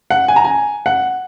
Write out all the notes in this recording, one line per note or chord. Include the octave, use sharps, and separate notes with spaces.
F#5
G#5
A#5
G#5
F#5